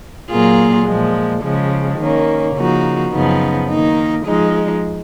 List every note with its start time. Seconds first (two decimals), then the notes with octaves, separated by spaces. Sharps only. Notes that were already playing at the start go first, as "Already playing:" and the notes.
0.30 A#2 F#3 A#3 F4 G#4
0.87 A#2 F3 G#3
1.43 C#3 F3 G#3
1.99 D#3 A#3 C#4
2.56 C#3 F3 A#3 D#4 F#4
3.12 F#2 C#3 F3 B3 D#4
3.69 D#3 A#3 D#4
4.25 F3 G#3 D#4